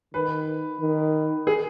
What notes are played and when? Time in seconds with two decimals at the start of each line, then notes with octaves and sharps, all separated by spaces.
0.14 D#3 B4
0.81 D#3
1.47 G#4